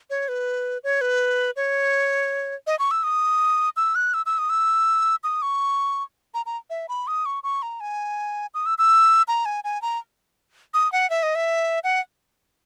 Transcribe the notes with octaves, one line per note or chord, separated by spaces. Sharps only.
C#5
B4
C#5
B4
C#5
D#5
C#6
E6
D#6
E6
F#6
E6
E6
D#6
E6
D#6
C#6
A#5
A#5
E5
B5
D#6
C#6
C#6
A#5
G#5
D#6
E6
E6
A#5
G#5
G#5
A#5
D#6
F#5
E5
D#5
E5
F#5